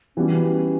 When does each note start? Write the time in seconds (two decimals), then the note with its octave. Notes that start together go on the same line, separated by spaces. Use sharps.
0.16 E3 G3 B3 C#4 F#4